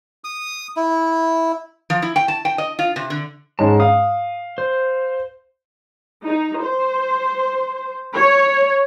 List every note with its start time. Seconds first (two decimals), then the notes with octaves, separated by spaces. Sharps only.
0.24 D#6
0.76 E4
1.90 F3
2.02 E4
2.16 G5
2.28 A5
2.45 G5
2.58 D#5
2.79 F4
2.96 C3
3.10 D3
3.59 G#2 G#3 C#4 A5
3.80 F5 D#6
4.58 C5
6.26 D#4
6.64 C5
8.18 C#5